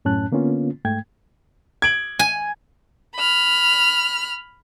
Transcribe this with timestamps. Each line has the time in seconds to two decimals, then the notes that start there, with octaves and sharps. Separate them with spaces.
0.05 F#2 A2 C#4 A5 F#6
0.32 D3 A#3 B3 C#4 F4
0.85 G#2 A3 G5 G#6
1.82 G#6 D7 F#7
2.19 G#5
3.16 B5 F6